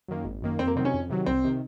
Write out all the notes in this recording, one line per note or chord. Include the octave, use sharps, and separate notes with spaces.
F#2 D#3 A#3
G#1
F#2 D#3 A#3
F2 C4
A#3
C3 D#3 F#3 C4
C#4
F2
C3 D#3 F#3
C2 C4
C3 D#3